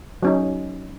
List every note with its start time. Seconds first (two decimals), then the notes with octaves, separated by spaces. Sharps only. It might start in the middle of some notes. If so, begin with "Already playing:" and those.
0.23 F#3 C#4 D#4